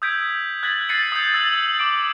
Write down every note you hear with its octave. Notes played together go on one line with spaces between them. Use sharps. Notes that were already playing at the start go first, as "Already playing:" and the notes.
D#6 E6 G6 G#6 B6 D7
F#6 G#6 A6 B6 F#7
F#6 A6 C7 C#7 D#7 F#7
D#6 G6
E6 F#6 A6 F#7
D6 D7